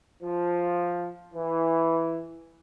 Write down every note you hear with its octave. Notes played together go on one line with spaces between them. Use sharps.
F3
E3